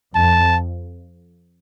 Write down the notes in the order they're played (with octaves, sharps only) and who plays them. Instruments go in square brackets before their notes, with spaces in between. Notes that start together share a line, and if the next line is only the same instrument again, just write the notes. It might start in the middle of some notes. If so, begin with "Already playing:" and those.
[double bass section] F2 [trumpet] A5